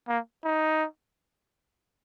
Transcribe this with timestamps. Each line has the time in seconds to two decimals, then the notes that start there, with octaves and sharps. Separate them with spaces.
0.08 A#3
0.44 D#4